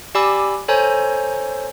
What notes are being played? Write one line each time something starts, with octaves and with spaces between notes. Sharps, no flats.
G4 D5 G#5 B5 D6 E6
A4 C5 C#5 G#5 A#5 G6